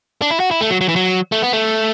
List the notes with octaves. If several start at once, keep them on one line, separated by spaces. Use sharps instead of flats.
D4
E4
F#4
E4
A3
F#3
F#3
E3
F#3
A3
B3
A3